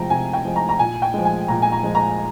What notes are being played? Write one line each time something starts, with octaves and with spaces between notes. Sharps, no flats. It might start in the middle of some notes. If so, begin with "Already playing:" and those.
Already playing: C3 F3 G#3 G5 A#5
C3 G#5
G5
F3 G#3
A#5
A#5
A#2 G#5
G5
F3 G#3
G#5
A#2 A#5
G#5
A#5
F3 G#3
A#5